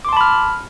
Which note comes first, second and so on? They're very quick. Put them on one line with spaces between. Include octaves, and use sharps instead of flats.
D6 C6 A5 B5 F6